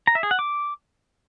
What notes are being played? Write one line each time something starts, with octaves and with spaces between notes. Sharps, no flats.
A#5
E5
G#4
F#5
D6